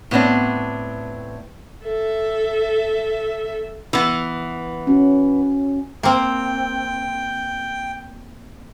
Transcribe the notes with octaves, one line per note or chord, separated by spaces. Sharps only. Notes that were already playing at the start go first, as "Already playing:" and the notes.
A2 B3 C4 D4
A4 E5
E3 B3
C#4 F#4
A#3 C4 G5